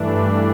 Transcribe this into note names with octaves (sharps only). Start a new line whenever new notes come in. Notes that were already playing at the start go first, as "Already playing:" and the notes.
Already playing: G2 E3 A3 D4
B4